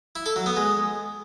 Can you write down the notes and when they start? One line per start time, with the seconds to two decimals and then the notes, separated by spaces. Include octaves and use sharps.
0.16 E4
0.26 A4
0.36 F#3
0.46 B3
0.56 G#3